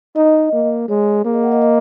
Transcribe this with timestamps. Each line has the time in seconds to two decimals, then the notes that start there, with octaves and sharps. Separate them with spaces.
0.16 D#4 D#5
0.53 A#3
0.88 G#3 C#5
1.25 A#3 G#4
1.34 D#5
1.43 F#5
1.52 D#5
1.62 D#5